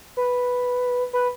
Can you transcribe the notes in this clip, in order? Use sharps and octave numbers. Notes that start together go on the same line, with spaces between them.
B4
B4